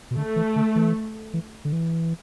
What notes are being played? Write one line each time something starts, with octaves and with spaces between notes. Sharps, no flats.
B2
D3 A3
E3
D3
E3
E3
D3
E3